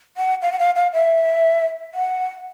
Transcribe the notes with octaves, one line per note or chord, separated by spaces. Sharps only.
F#5
F5
F#5
F5
F5
E5
F#5